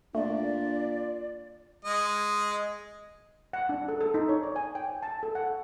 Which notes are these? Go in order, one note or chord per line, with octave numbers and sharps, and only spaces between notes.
A#2 A3 D4 D5
G#3 D#5
F#5
D4
A4
A4
D#4
C#5
D5
G#5
G5
A5
A4
F#5